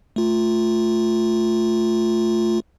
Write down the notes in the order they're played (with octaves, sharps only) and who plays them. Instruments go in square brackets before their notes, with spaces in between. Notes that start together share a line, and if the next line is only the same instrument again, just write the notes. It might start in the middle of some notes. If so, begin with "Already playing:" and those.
[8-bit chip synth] A3 F4